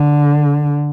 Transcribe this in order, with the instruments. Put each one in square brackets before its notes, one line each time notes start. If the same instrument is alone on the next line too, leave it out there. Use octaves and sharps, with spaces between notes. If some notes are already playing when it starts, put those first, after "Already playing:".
Already playing: [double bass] D3